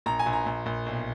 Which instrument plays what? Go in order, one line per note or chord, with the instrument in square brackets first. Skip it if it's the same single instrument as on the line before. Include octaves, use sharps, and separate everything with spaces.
[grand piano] A#1 A#5
G#5
A#1
A#5
A#1
A#1
B1